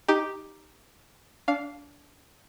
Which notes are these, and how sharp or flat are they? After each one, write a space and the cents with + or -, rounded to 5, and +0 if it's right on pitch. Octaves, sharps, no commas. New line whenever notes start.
D#4 +0 G4 +0
D4 -25 F5 +0